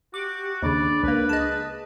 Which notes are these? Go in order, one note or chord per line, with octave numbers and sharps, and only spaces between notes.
F#4 G4 D6
D#2 C#3 D4 D5 B5
C#2 A#3 B4
G#4 D#5 A5